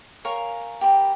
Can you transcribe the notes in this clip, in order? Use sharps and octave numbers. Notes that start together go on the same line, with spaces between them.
A#4 C#5 F5 G#5
G4 A#4 B5